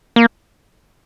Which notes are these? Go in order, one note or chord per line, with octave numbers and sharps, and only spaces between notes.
A#3